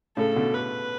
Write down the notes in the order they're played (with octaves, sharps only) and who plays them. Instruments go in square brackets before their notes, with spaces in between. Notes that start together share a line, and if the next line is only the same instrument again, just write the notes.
[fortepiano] A2 C#3 [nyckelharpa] A4
[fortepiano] B2 D3
[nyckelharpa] B4